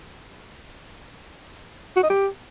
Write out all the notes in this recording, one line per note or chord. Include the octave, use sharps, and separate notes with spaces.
F#4
D#5
G4